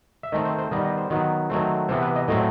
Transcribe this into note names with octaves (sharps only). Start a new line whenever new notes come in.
E5
D#3 A3 C4 D#5
C5
C5
D#3 G3 B3 D#5
D#5
C5
D#3 F#3 B3
D#3 F#3 A3 C4
C3 E3 B3 C5
B4
D#5
A2 F#3 A3 C4 D#5